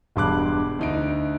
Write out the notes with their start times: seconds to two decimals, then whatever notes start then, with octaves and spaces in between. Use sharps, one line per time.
0.16 E1 G2 C6 D6 F#6
0.79 D2 D#4 D7